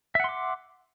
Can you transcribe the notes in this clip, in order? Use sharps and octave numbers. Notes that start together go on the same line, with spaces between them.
E5 F#5 C6 D6